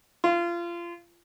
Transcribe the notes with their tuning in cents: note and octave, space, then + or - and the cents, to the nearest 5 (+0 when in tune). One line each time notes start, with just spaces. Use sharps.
F4 -25